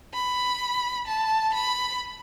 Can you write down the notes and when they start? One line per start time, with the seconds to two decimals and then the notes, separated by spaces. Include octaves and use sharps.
0.14 B5
1.07 A5
1.54 B5